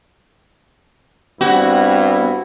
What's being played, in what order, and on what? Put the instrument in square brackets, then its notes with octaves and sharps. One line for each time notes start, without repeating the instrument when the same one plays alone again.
[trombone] G2 [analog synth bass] B3 [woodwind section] C4 E4 [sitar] F#4